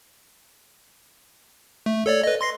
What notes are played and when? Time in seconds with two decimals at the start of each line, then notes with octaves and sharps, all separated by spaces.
1.86 A3
2.06 A4 C#5 D5
2.23 B4 D#5
2.41 C6 A#6 C7